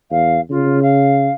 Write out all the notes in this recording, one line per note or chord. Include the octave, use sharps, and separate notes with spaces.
E2 F5
C#3 F4
F5